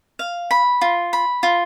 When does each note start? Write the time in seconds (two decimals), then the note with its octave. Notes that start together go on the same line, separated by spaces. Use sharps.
0.19 F5
0.51 B5
0.81 F4
1.13 B5
1.43 F4